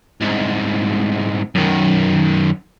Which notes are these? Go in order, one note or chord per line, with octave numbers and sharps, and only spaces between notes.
C2 G#2
F#2 D#3